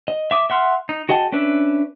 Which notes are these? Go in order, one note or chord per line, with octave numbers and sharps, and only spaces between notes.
D#5
E5 D6 D#6
E5 F#5 C6 F6
D#4
F#4 G#4 D#5 G5 A5
C#4 D4 B4 E5